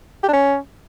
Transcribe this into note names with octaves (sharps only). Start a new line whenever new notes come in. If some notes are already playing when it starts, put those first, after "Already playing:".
G4
D4
C#4